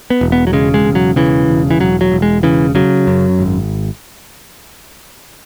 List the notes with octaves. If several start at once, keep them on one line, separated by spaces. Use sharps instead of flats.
B3
E1
B3
F#3
C#3 G#3
G#3
E1
F#3
C#3 E3
E1
E3
E1 F#3
F#3
E1
G#3
C#3 E3
C#3 F#3
F#2
G#1